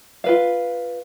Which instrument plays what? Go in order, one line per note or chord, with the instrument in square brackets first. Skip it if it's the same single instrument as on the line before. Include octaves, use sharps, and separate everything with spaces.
[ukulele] F4 B4 F5